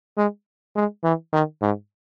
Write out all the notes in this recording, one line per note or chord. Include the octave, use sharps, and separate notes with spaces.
G#3
G#3
E3
D#3
G#2